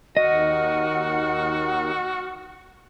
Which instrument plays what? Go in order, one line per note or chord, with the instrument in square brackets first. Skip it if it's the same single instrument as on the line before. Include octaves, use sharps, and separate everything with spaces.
[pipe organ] D#2 D#3 [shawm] F#4 [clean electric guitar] D#5 [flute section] F#5 D#6 F6